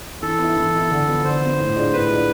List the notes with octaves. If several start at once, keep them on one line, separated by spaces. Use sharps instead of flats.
E3 A4
B3 E4
E3
B3 E4
D3
F3 B3
D3 C5
F3 B3
A2
G#3 D4 F4
A2 B4
G#3 D4 F4